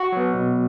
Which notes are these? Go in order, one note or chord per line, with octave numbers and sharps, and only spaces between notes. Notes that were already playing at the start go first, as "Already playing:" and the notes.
Already playing: F#4
F#3 B3
B2